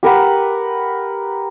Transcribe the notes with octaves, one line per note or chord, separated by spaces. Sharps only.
G4 A#4 B4 F#5